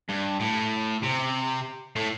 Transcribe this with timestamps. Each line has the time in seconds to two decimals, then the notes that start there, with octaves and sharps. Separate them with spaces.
0.09 G2
0.40 A2
1.03 C3
1.96 A2